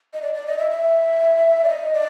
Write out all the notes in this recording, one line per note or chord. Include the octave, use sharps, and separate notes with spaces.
D#5
D5
D5
D#5
E5
E5
D5
D#5
D5